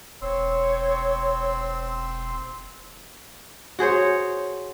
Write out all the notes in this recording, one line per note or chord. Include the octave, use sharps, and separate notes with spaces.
E1 C4 C#5 C6 E6
F#4 G#4 C5 C#5